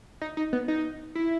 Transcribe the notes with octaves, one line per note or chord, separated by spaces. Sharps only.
D#4
D#4
B3
D#4
E4